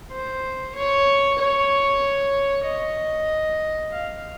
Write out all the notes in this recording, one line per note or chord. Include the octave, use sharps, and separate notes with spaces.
C5
C#5
C#5
D#5
F5